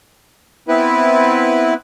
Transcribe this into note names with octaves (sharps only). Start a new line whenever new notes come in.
B3 C4 E4 B4